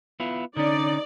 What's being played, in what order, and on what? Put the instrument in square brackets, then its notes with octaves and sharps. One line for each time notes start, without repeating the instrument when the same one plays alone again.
[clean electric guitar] B3 E4 F4
[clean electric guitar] D3 C#4 [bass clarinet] D#4 [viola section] D5